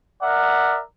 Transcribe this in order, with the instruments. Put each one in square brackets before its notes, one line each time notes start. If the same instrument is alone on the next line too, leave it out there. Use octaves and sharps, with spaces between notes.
[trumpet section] A#4 D5 E5 F#5